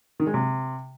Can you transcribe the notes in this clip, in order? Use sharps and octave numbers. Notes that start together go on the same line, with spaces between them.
D#3
G#3
C3